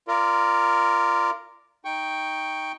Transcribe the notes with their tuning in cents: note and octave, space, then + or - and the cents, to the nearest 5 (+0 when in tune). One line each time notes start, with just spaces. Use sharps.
F4 -15 A#4 +0 D5 +0
D#4 +0 G5 +5 C#6 +0